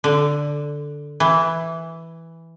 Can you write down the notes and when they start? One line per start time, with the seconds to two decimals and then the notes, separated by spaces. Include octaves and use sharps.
0.04 D3
1.20 E3